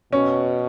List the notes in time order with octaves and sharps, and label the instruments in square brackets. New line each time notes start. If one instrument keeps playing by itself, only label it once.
[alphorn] B2 [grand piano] C#4